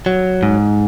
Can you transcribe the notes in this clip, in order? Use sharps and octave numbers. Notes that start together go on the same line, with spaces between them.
F#3
G#2